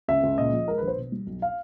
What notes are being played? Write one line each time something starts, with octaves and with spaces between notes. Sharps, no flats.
C#2 E5
C#2
A#2 D#5
F3
G#3 A#4
A#1 B4
C5
B2
G3
B1
F5